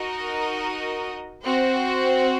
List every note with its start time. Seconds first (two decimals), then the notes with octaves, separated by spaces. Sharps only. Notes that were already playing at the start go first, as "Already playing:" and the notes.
Already playing: D#4 F#4 A#4 D#5
1.44 C4 F#4 C5